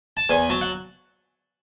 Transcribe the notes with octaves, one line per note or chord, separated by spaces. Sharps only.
A5
E2 G#5
F#3 A5
F#5